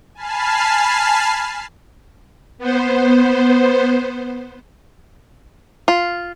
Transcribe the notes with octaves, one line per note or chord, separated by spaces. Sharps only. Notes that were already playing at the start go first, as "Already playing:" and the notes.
G#5 A5 B5 F6 C7
B3 C5
F4